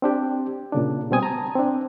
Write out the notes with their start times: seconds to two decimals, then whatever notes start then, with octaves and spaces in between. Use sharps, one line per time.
0.02 C4 D4 G4
0.72 A#2 C#3 D4
1.11 B2 G3 C4 G#5 D#6
1.23 A5 A#5
1.55 C4 D4